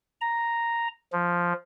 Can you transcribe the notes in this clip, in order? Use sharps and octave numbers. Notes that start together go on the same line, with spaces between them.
A#5
F3